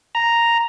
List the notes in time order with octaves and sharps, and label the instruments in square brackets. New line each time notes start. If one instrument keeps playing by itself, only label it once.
[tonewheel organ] A#5